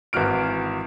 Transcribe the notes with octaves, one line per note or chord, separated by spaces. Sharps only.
G#1 E3 F#4 F6 D7